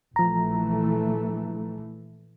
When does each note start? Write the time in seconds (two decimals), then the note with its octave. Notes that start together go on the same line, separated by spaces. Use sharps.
0.16 A#1 E3 F3 A3 A#5